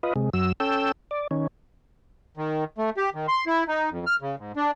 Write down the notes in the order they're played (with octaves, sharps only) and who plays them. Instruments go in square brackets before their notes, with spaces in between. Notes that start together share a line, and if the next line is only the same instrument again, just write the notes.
[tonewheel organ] F4 B4 D#5
C3 G#3
F#2 F#3 E6
C#4 A4 G5 E6
D5
D#3 C#4
[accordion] D#3
A3
G4
D#3
C6
E4
D#4
F2
F6
C#3
G#2
D4